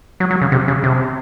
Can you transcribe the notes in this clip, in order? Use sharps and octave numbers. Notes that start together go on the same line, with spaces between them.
F#3
F#3
C#3
C3
C#3
C3